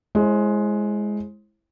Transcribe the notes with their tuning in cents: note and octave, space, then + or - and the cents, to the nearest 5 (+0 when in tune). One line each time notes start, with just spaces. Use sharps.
G#3 +10 E4 +0 C5 +40